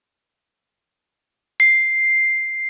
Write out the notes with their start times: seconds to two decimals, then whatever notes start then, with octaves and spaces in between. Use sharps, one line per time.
1.60 C7